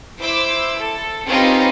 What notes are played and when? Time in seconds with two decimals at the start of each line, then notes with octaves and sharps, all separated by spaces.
0.20 E4 C5 D6 E6
0.77 A4
1.27 C4 C#4 D#4 F4 G4 B4